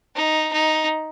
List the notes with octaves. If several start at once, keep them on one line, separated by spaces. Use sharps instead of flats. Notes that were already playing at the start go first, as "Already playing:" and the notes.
D#4
D#4